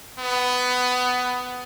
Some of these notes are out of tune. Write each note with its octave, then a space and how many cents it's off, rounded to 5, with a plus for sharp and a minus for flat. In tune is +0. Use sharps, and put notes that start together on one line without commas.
B3 +15